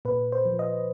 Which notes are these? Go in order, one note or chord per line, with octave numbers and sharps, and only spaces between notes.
A#2 B4
C5
F3
D#5